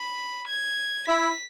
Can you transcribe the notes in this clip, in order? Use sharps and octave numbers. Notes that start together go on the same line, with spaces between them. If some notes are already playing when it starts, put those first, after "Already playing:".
Already playing: B5
G#6
E4 B6